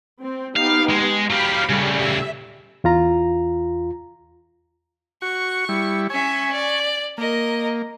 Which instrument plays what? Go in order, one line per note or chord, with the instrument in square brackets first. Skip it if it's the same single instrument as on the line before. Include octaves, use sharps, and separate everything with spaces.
[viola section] C4
[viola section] B3 D#4 G4 [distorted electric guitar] F5
[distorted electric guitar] G#3
[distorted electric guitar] F#3 G4 [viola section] F5 B5
[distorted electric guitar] C#3 A3 [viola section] G3
[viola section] E5
[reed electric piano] E2 F4 A#5
[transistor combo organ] F#4 [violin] C#6
[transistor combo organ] G3 E4
[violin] C#4 E5 [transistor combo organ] G#5 C#6
[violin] D5
[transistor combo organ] A#3 [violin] A#4 D#5